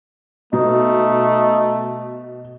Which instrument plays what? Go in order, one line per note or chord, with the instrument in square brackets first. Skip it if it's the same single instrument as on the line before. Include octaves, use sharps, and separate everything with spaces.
[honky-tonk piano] B2 [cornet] A3 [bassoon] D#4